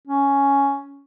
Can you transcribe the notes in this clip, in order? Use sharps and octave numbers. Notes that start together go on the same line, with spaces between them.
C#4